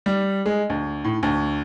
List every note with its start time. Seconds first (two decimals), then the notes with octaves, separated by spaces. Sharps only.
0.06 G3
0.46 G#3
0.70 D2
1.04 A2
1.23 D2